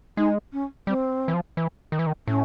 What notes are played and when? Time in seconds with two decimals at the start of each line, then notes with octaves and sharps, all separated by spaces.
0.17 G#3 D#4
0.53 C#4
0.87 G3 C4
1.28 E3
1.34 F3
1.57 E3
1.92 D#3
1.99 E3
2.07 D#3
2.27 A2 C#4